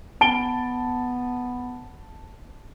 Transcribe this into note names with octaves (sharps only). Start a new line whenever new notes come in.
B3 A5 D7 G7